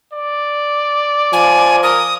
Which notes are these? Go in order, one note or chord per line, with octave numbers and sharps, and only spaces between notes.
D5
F3 G#5
A#4 D#6